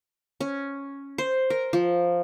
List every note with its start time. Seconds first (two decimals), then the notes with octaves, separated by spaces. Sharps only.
0.40 C#4
1.18 C5
1.50 A#4
1.73 F3